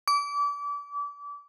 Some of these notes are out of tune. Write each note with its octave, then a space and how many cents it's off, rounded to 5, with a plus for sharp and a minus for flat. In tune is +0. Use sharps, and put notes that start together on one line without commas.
D6 -30